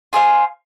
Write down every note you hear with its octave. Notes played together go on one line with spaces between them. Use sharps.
F4 G#4 C5 F5